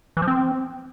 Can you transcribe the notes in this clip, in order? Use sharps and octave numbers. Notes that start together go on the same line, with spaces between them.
E3
F3
C4